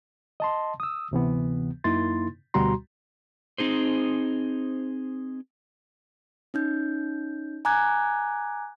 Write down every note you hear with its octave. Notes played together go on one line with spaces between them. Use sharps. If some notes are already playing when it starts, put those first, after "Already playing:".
D#5 A5 C6
D#6 E6
D2 C3 E3 B3
F#2 A#3 D#4 E4 C6 A6
D2 B2 G3 F#4 A#5 C6
C4 D#4 G#4 C5
C#4 D#4 G6
G#5 A#5 D6 F#6 G#6